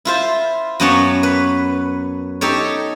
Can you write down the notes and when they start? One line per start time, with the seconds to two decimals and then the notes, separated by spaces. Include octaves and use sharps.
0.05 E4 F4 C5
0.80 F#2 A#3 B3 C#4 C#5 A5
1.23 B4
2.41 D#4 G4 A4 C#5